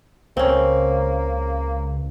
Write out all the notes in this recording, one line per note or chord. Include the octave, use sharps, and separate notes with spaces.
C#2 A#3 C4 C#4